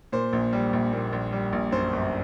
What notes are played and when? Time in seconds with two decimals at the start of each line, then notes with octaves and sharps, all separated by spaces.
0.12 A#2 C5
0.33 A#1
0.53 G3
0.73 A#1
0.93 A#2
1.13 A#1
1.32 G3
1.53 A#1
1.72 F#2 C5
1.93 G1